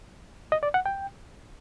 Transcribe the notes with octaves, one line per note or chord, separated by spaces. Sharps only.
D#5
D5
F#5
G5